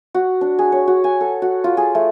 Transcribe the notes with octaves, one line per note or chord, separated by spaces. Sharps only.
F#4
D4
G#4
C#5
F#4
G#5
A4
F#4
F4
G#4
A3